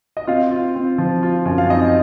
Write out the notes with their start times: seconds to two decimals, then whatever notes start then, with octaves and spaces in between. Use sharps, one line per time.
0.17 D#5
0.27 C4 F4 F5
0.51 F4
0.76 C4
0.98 F3
1.23 F4
1.46 F#2
1.58 F5
1.69 C4 D#4 D#5